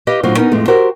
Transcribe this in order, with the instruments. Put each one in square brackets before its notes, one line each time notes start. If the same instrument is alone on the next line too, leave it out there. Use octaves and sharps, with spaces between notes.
[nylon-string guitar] G4 B4 D#5 F5
A2 D3 F#3 F4 C5
B3 C#4 D#4 A#4
F2 A2 G#3 A3
F#4 G4 A#4 C5